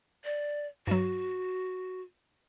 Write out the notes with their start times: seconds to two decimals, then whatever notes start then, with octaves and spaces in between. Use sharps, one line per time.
0.25 D5
0.87 G2 F#3 F#4